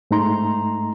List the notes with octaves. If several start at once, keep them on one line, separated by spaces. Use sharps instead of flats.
G#2 A3 D#4 A#5 C6